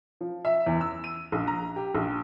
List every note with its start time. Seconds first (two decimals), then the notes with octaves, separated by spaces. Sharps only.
0.21 F3
0.45 E5
0.66 E2
0.81 E6
1.04 D#7
1.32 A#1
1.47 A#5
1.76 G4
1.95 A#1